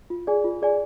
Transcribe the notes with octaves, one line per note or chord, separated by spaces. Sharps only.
F4
G#4 D5 G#5
F4
G#4 D5 G#5